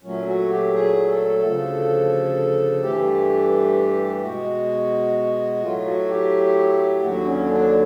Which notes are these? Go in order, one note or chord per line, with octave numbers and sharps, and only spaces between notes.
A#2 F#3 A3 C#4
F#4
G4
G#4
A4
D2 C#3 F3
G2 E3 A3 G4
B2 G#3 F#4
A2 F#3 A3 F4
F#4
G4
D#2 D3 F#3 F#4
C#4
D4